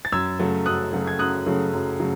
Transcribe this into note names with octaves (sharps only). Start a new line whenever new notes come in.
A6
F#2 E6 G#6
C#3 F#3 A3
F#2 D#6 F#6
C#3 F#3 A3
G#6
F#2 D#6 F#6
C#3 F#3 A3
F#2
C#3 F#3 A3